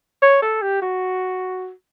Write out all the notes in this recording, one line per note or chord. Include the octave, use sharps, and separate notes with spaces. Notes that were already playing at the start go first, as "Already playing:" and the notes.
C#5
A4
G4
F#4